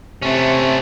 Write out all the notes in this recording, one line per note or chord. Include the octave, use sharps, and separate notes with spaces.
C3 A3 C#4